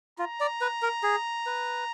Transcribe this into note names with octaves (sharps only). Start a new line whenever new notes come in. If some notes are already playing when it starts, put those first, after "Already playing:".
F4 A#5
D5
B4
A#4
G#4
B4